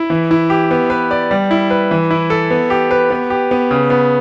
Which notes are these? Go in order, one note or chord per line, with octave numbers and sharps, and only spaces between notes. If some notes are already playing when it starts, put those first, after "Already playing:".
Already playing: E4
E3
E4
G4
B3
B4
D5
G3
E4
B4
E3
E4
A4
B3
G4
B4
B3
G4
B3
C#3
B3